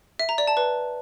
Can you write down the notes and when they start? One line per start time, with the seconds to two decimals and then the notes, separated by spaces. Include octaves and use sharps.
0.19 E5
0.29 A#5
0.38 D5
0.47 A5
0.57 B4